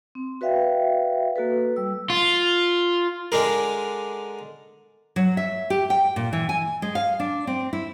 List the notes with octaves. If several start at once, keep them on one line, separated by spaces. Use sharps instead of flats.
C4
F#4 B4 D5 E5 F5 G5
A#3 F#4 A4 B4
G3 E6
F4
D3 G#3 D4 G#4 A#4
F#3
E5
G4
G5
A#2
E3
G#5
G#3
F5
D4
C4
E4